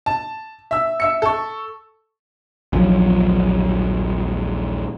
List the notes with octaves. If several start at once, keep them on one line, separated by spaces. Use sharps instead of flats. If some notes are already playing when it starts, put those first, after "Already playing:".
A5
E5 E6
E5 E6 C#7
A4 C#6
A#1 D#2 F3 F#3